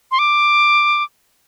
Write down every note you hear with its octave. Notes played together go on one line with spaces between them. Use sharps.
C6
D6